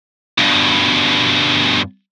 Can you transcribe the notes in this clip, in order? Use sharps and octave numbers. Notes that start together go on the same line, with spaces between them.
G2 B2